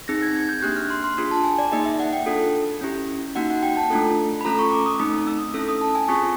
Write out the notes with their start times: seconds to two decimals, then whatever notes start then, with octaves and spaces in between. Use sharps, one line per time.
0.08 C4 D#4 G#4 A#6
0.22 G#6
0.35 G#6
0.49 G6
0.62 A#3 D4 G4 F#6
0.77 F6
0.90 C6
1.04 C6
1.18 D4 F4 G#4
1.31 A5
1.44 G#5
1.58 D5
1.72 A#3 D#4 G#4 D#5
1.86 E5
2.00 F#5
2.13 G5
2.26 D4 F4 A4
2.81 C#4 E4 G4
3.35 A#3 D#4 F#4 F#5
3.50 F#5
3.63 G5
3.77 A5
3.90 A3 D4 F4 A4
4.41 B5
4.45 A3 C#4 F4 A4 A#5
4.59 C#6
4.72 D6
4.86 D#6
4.99 A3 C4 D#4 D#6
5.27 E6
5.54 C#4 E4 A4 E6
5.68 D#6
5.81 A5
5.95 G#5
6.08 C4 F4 G#4 C#6